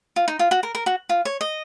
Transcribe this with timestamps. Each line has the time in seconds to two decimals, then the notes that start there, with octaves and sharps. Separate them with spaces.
0.16 F4
0.28 D#4
0.39 F4
0.51 F#4
0.63 A#4
0.75 A#4
0.86 F#4
1.09 F4
1.25 C#5
1.41 D#5